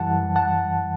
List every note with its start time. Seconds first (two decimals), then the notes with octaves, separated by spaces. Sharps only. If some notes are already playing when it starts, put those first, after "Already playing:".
Already playing: F#2 E3 G3 F#5 A5
0.36 F#5 A5